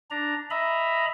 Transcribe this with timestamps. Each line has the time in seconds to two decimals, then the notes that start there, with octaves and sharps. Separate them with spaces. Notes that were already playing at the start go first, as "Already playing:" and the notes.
0.11 D4 A#5
0.50 D#5 E5 A#5 B5